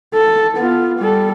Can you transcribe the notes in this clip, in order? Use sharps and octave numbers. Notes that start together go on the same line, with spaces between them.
A4
B3 F4
G3 A4